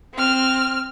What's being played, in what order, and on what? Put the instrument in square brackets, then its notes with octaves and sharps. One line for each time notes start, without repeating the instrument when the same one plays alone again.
[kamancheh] C4 F6